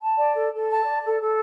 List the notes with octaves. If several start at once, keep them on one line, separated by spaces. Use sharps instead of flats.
A5
D5
A4
A4
A5
D5
A4
A4